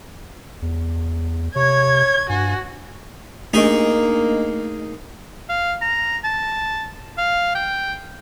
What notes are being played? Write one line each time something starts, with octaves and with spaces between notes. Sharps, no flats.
E2
C3 C#5 G#6
G2 F#4 G#5
A3 A#3 D4 D#4 G#4 D#5
F5
A#5
A5
F5
G5